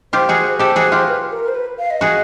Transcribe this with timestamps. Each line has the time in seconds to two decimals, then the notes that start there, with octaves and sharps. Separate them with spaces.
0.13 F4 G4 C5
0.29 F#4 G#4
0.59 G4 A4 C5
0.76 F#4 G#4
0.92 F4 G4
1.08 B4
1.31 A#4
1.43 A#4
1.48 C5
1.55 B4
1.79 F5
1.91 D#5
2.01 F#4 G#4